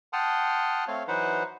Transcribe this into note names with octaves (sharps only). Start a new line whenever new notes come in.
F#5 G5 A5 C6 D#6 F6
A3 C4 C#5 F5
E3 F#3 D#4 B4 C5 F#5